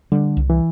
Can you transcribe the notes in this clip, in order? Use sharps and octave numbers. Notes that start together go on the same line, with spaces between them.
D3 G3
C2
E3